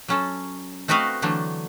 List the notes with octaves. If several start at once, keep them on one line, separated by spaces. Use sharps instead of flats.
F#3 C#4 A4
A3 C4 F#4 B4 D#5 F5
D3 E3 F#3 A3 D4